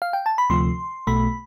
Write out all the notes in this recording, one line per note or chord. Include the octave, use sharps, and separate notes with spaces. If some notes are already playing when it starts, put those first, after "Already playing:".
F5
G5
A5
B5
D2 C3 F3 A3 C6
B1 B2 A3 B5